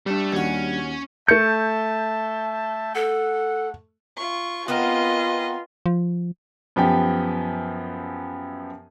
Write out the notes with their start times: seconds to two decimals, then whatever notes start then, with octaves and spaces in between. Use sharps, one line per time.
0.06 G3 A3 D4 A4
0.32 D#2 C#4 F#4
1.28 A3 E5 A5 G6 C#7
2.95 A4 F#5
4.17 F4 C#6
4.68 B3 C4 F4 A#4 B4 D#5
5.86 F3
6.76 F#2 F3 B3 G4 G5